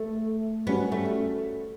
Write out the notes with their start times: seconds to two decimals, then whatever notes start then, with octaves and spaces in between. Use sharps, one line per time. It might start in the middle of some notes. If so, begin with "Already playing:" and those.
Already playing: A3
0.67 G3 B3 C#4 F#4
0.92 A3